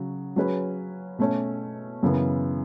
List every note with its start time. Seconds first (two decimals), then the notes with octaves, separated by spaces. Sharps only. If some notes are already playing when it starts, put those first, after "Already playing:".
Already playing: C#3 F#3 F#4
0.36 F#3 C#4 G#4 B4
1.19 B2 A3 C#4
2.03 F#2 C#3 E3 B3